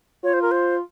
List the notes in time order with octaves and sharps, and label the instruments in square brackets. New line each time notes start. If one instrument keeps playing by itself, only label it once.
[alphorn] F4 [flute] C#5
[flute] C5
A#4
C5